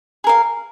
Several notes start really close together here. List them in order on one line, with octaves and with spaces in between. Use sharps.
G#4 A#4 F5